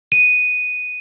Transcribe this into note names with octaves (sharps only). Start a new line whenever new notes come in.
D#7